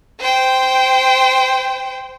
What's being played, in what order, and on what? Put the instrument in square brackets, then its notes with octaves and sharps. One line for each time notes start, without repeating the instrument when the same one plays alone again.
[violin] C5 G5